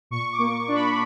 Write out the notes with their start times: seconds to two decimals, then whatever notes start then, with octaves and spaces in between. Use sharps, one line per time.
0.11 A#2 C#6
0.32 D6
0.39 A#3
0.68 D4
0.75 B5